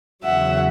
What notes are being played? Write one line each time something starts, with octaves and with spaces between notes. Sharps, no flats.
E2 C#3 F#3 E5 F#5